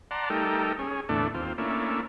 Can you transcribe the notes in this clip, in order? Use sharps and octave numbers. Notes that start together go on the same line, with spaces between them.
D5 F#5 A5 A#5 C6
G3 A3 D#4 A4 A#4 G5
C#4 G#4
E2 A2 D3 A3 D4
D#2 C4 F4
A3 A#3 C#4 D4 E4